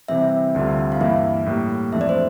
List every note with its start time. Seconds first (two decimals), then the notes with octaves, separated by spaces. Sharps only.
0.08 C3 E3 G3 C4 E5
0.55 D2 D3 G3 C4 F4
0.92 F5
1.00 G2 E3 A#3 E4 E5
1.46 A2 G3 A#3
1.92 F2 E3 A3 D4 E5
2.01 D5
2.09 C5